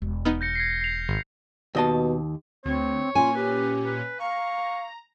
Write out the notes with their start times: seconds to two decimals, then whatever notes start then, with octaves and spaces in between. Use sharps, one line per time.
0.02 E1
0.25 B3 D#4 F6
0.41 G6 A#6 C#7
0.55 G#6 A#6 C7
0.81 C7 F7
1.09 G#1
1.75 D#2 B2 D#5 A5
2.65 D2 C4 C#5
3.15 A#2 C#4 F4 G#5
3.35 G4 B4
3.85 B4
4.20 F5 A#5 C#6